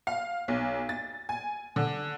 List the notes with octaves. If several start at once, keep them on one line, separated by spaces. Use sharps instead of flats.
F5
B1
A6
G#5
D3